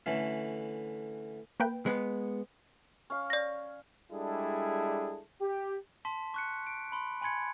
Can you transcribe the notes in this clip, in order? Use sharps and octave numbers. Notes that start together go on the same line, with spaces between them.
D3 E3 A3 C#4
A#3 B4 G5
G#3 B3
C#4 F5
D5 A#6
G3 G#3 D4 E4 G#4 A4
G4
A5 C6 B6
C#6 F#6 C#7
D7
B5 C6
G#5 B5 C6 G#6 C#7